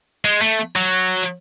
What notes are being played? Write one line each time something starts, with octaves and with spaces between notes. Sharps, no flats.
G#3
A3
F#3